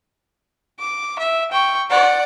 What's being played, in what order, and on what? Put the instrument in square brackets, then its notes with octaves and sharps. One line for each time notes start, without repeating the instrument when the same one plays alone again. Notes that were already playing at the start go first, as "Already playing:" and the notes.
[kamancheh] D6
E5
G5 C#6
D5 F#5